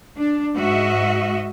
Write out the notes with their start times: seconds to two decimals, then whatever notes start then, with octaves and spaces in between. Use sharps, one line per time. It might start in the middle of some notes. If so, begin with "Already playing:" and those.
0.17 D4
0.57 G#2 F#4 D#5 E5